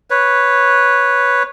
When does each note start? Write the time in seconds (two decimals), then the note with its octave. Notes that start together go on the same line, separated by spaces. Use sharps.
0.10 B4 C#5